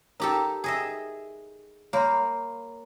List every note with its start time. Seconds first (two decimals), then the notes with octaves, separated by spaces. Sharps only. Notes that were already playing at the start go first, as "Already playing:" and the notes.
0.20 D#4 G4 A4 A#4
0.64 G#4 D#5 E5
1.93 A#3 C#5 B5 C6